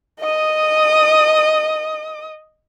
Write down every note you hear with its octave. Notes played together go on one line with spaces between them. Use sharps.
D#5 D#6